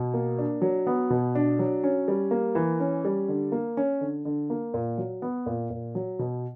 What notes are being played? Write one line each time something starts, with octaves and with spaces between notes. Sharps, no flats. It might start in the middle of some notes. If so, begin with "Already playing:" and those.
Already playing: B2
A#3
D4
F#3
B3
B2
D4
F#3
C#4
G3
A#3
E3
C#4
G3
D3
A#3
C#4
D3
D3
A#3
A#2
F#3
B3
A#2
A#2
F#3
B2